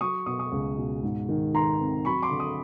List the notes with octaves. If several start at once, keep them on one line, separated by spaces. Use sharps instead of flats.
F#3 C#6 D#6
B2 C#6 D#6
C#6 D#6
C#2
B2
G#2
D#3
D#3 A#5 C6
C4
F#3 B5 C#6
C6 D6
D3
C#6 D#6